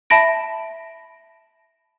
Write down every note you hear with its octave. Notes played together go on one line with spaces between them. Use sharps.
E5 A5 B5 A#6 D7